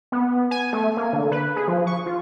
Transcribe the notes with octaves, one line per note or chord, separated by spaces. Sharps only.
B3
G#5
A3
A#3
D3
B4
G#4
F3
C#6
F4